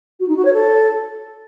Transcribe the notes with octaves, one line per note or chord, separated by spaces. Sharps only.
F#4
D#4
F#4
C#5
A4